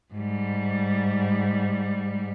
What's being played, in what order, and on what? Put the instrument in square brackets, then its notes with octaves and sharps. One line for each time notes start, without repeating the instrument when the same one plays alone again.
[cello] G#2 G3